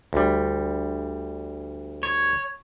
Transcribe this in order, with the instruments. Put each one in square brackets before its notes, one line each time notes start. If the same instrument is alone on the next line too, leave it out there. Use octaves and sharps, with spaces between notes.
[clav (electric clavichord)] D2 G3
[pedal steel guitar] C#5